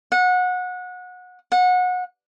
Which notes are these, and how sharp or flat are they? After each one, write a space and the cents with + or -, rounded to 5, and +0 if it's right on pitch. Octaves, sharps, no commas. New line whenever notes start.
F#5 -25
F#5 -25